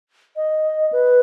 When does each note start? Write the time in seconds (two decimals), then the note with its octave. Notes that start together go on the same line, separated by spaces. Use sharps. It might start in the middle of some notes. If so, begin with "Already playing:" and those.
0.36 D#5
0.92 B4